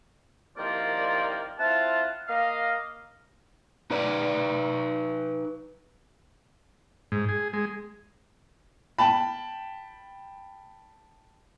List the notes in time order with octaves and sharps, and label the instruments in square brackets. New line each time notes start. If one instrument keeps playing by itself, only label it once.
[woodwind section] C2 D#3 F3 A#3 F4 D5
C4 E4 F4 F5 F#5 A5
A#3 D#5 F5
[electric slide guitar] D#4 B4 D5
[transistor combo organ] G#2
G#4
G#3
[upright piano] G5 A5 B5